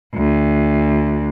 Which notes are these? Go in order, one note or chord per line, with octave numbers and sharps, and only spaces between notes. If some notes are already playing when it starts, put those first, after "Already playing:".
D2